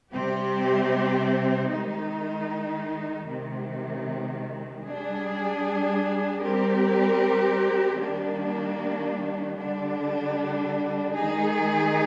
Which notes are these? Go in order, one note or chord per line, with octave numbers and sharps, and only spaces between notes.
C3 G3 C4 G4
D#3 G#3 D#4
C3 D#3 G#3
G3 D4 G#4
G3 C4 G4 A#4
D#3 G3 A#3 D4
D3 G3 D4
D#3 G#3 D#4 G#4